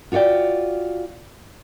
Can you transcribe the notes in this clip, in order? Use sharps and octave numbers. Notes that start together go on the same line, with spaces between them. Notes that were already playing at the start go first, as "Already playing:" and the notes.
F4 F#4 C#5 D5 G5